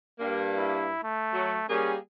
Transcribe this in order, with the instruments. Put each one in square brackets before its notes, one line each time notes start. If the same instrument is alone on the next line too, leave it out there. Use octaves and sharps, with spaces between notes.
[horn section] G2 A#3
[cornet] E4
A3
[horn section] F#3
[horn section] G3 A#3 G#4 [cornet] C#4